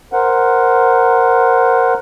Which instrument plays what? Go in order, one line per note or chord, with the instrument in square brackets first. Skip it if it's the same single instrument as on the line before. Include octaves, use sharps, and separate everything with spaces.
[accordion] A#4 C5 F#5